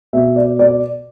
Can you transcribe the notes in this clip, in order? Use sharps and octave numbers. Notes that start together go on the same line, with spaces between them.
B2 E5
D5
D5